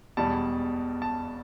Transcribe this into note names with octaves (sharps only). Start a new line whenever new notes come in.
E1 E2 B2 G3 A5
A5